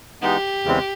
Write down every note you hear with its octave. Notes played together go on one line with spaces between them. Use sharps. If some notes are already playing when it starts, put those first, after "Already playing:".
E3 G#3 B3 D#4 G4
E2 C#3 E3 G#3 C4